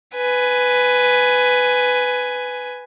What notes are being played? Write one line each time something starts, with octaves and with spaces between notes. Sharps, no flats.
B4 G#5